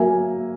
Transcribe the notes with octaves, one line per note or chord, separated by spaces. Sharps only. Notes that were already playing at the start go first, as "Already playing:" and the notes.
Already playing: F#3 A#3 E5 G#5